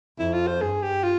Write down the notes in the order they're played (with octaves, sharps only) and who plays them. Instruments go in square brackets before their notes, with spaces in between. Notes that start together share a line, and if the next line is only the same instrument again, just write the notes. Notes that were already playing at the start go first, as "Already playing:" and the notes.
[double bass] F2 [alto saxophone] E4
[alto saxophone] F4
C5
[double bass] G2 [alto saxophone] G#4
[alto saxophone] G4
F4